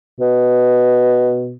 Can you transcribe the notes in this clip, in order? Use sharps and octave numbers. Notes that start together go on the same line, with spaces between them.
B2